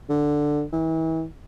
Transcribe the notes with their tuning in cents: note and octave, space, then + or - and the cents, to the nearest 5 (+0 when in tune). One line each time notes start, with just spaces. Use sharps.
D3 +5
E3 -35